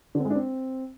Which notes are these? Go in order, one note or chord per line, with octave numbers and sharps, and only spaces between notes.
D3
C4
G#3
D4
C4